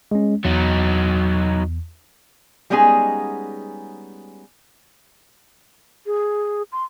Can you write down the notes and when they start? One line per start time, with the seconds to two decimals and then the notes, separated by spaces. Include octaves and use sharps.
0.11 G#3 C#4
0.45 E2 F#3 D#4
2.70 G3 G#3 B3 C#4 D#4 G#4
6.06 G#4
6.72 C6